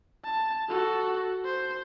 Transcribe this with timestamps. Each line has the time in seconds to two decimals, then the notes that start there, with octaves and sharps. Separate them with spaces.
0.24 A5
0.69 F#4 A4
1.45 C5